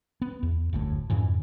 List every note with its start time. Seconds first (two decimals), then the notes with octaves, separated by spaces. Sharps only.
0.22 B3
0.43 E2
0.73 F#1 D2 A2
1.10 F2 G#2 C#3 E3